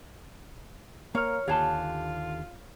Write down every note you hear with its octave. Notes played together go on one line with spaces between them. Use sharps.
A#3 A#4 C#5 F5 F6
D#2 D3 F4 G4 F5 G#5 A5 F#6